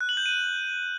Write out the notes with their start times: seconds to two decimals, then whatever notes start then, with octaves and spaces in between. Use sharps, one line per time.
0.01 F#6
0.09 F#7
0.17 G6
0.26 D#7